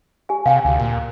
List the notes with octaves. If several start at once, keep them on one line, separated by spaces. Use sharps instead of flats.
G4 G#5
C3 F5 G5 G#5
D2
A#2